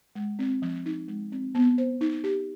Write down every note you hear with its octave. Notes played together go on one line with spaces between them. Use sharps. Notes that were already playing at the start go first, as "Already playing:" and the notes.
G#3
C4
F3
D#4
G#3
C4
B3
C5
D#4
G4